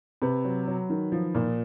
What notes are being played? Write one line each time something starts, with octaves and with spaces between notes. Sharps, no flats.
C3 B4
F#3
F#3
D#3
F3
A#2